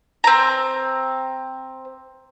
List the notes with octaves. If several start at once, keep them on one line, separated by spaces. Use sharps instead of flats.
C4 A#5